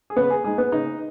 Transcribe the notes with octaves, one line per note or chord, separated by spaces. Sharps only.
G#4
C#3 B3 B4
G#4
G#3 D#4 G#4
B3 B4
C#3 D#4 D#5